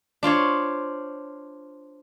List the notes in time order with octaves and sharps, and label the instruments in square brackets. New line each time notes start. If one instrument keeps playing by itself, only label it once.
[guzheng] D4 F4 C5 C#5